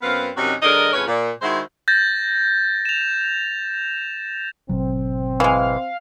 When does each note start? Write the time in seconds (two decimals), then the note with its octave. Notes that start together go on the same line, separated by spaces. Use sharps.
0.02 F#2 B3 C4 B4 F5
0.37 F#2 C3 D#3 C#4 D#4 F#4
0.62 D3 F#3 G#3 A#4 D5 D#5
0.93 F2 A2 C#3 C#4 B4 C#5
1.07 A#2
1.42 D#3 G#3 E4 F#4 C5
1.88 G6 A6 A#6
2.85 E7 F7
4.69 G#1 B2 F#3 C4
5.40 E3 G#3 F5